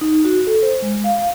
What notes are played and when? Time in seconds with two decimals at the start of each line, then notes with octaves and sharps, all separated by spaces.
0.01 D#4
0.25 F#4
0.47 A4
0.63 C5
0.82 G#3
1.04 F5